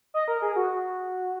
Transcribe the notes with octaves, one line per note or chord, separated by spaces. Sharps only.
D#5
A#4
G#4
F#4